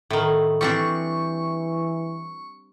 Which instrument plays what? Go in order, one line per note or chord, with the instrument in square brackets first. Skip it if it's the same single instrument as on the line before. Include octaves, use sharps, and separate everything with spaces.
[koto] A2 D#3
[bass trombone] E3 [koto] G3 C4 D4 [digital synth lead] C#6